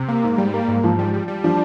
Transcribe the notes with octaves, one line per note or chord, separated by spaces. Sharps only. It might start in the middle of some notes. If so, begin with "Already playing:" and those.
Already playing: C3
A#3
G#2
G3
A#3
G#2
G#2 F3
G3
G3
G3
F3 D4